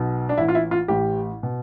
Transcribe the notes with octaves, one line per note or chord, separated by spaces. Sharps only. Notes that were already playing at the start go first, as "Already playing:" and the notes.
Already playing: B1 B2
D4
A1 A2 E3 E4
F4
E4
F4
A1 A2 E3 G4
B2